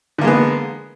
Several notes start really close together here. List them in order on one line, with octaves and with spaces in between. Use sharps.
D3 A#3 G#3 B3